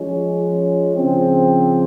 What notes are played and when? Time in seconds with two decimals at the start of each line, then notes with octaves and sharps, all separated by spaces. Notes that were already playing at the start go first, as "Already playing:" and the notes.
Already playing: F3 G#3 C#4
0.95 C#3 F3 C4